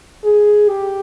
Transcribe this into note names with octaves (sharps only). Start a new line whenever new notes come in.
G#4
G4